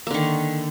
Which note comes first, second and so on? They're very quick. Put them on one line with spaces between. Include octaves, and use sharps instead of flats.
A#3 D3 D#3